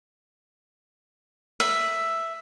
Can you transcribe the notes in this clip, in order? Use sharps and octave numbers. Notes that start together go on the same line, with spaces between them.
E5